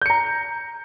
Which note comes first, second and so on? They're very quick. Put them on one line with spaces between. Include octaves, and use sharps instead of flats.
G6 C#7 A#5